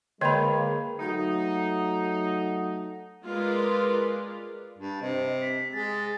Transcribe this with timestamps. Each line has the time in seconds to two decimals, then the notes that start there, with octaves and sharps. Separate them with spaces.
0.21 D3 G#3 A#3 C#5 D#5 G5 A5 B5
0.99 F#3 A3 D#4 F#4
3.25 G#3 F4 A#4 B4 D5
4.78 G2
5.01 C3 D#5
5.41 B6
5.73 G#3 A6